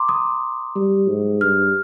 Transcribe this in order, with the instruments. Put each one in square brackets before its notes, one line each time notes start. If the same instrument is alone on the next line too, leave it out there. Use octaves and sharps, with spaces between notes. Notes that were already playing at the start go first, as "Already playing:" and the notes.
Already playing: [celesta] A#5 C6 D6
D#6
[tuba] G3
G#2
[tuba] G2 [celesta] F6